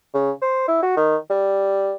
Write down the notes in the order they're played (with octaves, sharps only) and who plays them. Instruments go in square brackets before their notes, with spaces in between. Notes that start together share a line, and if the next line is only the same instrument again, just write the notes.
[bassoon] C#3
C5
E4
F#4
D#3
G3